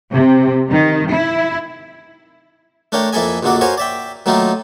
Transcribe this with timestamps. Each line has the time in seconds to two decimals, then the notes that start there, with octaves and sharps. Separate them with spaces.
0.11 C3
0.70 D#3
1.11 E4
2.92 A3 D4 A#4 C#5 G5
3.13 F2 A#3 E4 A4 D#5 G#5
3.43 A#1 F2 D3 A#3 F#4 D5
3.61 F#4 A#4 C5 C#5 F5 G#5
3.78 D5 E5 G5
4.26 D#3 F#3 A3 A#3 D#4 F4